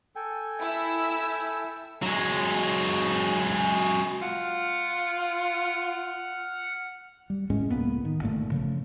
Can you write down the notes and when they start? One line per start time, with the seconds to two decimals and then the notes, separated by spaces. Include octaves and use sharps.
0.16 A4 G5 G#5
0.59 E4 E6
2.02 F#3 G#3
4.22 F4 F#5 F6
7.30 G3
7.50 D#1 A2 G#3 C#4
7.70 C#2 A2 A#3 B3
8.05 D#3
8.21 G1 A#2 A3
8.52 C#3 F3 A3